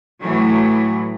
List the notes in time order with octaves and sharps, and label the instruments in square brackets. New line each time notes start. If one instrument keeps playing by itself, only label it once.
[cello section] A2 E3 F#3 A3